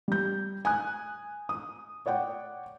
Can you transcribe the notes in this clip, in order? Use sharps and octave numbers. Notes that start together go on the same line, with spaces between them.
G3 G6
G#5 D#6 F#6
D#6
C#5 D5 F#5 G5